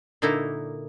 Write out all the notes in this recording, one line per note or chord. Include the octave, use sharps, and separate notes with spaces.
A#2 D3 A#3 D#4 E4 A#5